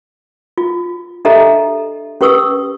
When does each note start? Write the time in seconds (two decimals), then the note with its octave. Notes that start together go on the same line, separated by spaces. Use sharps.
0.58 F4
1.25 D4 G4 A4 D#5 E5 A#5
2.21 C#4 G4 B4 C#6 D#6 E6